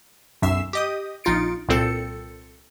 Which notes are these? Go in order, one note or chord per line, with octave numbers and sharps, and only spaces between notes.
B1 F#2 E5 E6 C7 E7
G4 D#5 D#6
A#1 D#4 F4 A6 C#7 D7
C2 A#2 C4 A4 C#7